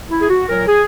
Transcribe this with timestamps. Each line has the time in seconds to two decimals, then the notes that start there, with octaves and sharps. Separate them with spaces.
0.10 E4
0.21 G#4
0.29 F#4
0.47 A#2 F#3 A#4
0.67 G#4